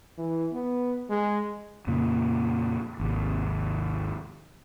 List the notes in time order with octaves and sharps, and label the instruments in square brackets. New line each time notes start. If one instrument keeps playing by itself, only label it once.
[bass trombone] E3
B3
G#3
[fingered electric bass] F2 A#2 C#3 A#3
G#1 D#2 C3